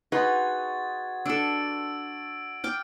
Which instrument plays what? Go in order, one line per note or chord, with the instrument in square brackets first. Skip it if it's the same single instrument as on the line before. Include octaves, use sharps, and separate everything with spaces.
[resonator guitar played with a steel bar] D#4 G#4 B4 [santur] F#4 C6 D#6 [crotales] G#6 A6
[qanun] D4 A4 [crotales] E6 D7
[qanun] G5 D6 [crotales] F6